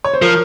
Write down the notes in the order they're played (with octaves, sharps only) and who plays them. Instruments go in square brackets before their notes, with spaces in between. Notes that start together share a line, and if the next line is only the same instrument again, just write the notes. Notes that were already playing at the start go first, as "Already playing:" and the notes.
[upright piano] C#5
C5
[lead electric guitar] F3 [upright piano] A#4